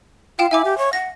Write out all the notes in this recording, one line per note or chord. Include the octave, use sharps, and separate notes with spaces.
F4 F5 G5 E7
E4 E5 G#5 D6
G4
C#5
F#5 A#6